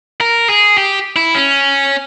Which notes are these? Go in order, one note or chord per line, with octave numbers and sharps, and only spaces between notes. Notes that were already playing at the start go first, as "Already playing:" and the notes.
A#4
G#4
G4
E4
C#4